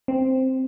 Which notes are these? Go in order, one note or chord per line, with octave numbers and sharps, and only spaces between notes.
C4